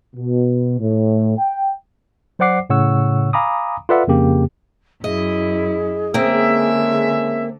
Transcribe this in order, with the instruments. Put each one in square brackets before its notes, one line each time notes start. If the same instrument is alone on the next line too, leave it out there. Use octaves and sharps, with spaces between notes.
[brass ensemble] B2
A2
G5
[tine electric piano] F#3 C5 D5 F#5 D6 C7
A2 C#3 C#5 F#5 C#6 E6
F5 G#5 A#5 B5 D6 D#6
F4 A4 B4 D5 E5 F#5
F2 C#3 A#3 G4
[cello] F#2 E4 [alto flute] G#4 [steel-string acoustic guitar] D#5
[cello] D3 [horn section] G#3 C#4 E5 [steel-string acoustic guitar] A#3 C4